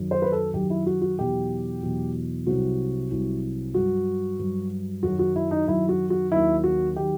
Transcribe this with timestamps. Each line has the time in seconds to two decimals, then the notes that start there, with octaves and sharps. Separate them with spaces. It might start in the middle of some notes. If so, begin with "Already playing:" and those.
Already playing: F#2 D#3 F#3
0.11 C5
0.22 B4
0.32 A4
0.53 F#2 D#3 F#3 G4
0.70 E4
0.86 F#4
1.02 F#4
1.18 E2 B2 F#3 G4
1.83 E2 B2 F#3
2.46 C2 C3 F#3 F#4
3.11 C2 C3 F#3
3.74 G2 F#3 F#4
4.39 G2 F#3
5.03 F#2 D#3 F#3 F#4
5.19 F#4
5.36 E4
5.51 D#4
5.67 F#2 D#3 F#3 E4
5.89 F#4
6.10 F#4
6.32 D#2 D#3 F#3 E4
6.64 F#4
6.96 D#3 F#3 G4